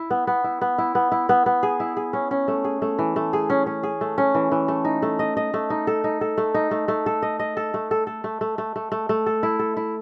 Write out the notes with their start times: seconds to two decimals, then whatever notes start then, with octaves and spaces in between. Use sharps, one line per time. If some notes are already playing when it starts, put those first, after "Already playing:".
Already playing: E4
0.10 B3
0.27 B3
0.44 E4
0.61 B3
0.78 E4
0.95 B3
1.12 E4
1.29 B3
1.46 B3
1.63 G#4
1.80 E4
1.97 G#4
2.13 C#4
2.31 C#4
2.48 A3
2.64 G#4
2.82 A3
2.99 E3
3.16 A3
3.33 G#4
3.50 C#4
3.66 C#4
3.83 G#4
4.01 A3
4.18 C#4
4.35 E3
4.52 E3
4.68 A3
4.85 D#4
5.02 A3
5.19 D#5
5.37 D#5
5.54 A3
5.70 D#4
5.87 A4
6.04 D#4
6.21 A4
6.38 A3
6.54 D#4
6.71 A3
6.88 A3
7.06 A4
7.22 D#5
7.39 D#5
7.57 A4
7.74 A3
7.91 A4
8.07 A4
8.24 A3
8.41 A3
8.58 A3
8.76 A3
8.92 A3
9.09 A3
9.26 A4
9.43 E4
9.59 A4
9.77 E4